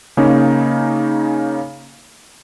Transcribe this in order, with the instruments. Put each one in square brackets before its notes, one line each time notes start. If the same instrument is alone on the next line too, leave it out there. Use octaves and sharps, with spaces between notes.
[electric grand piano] C#3 A#3 C#4 D#4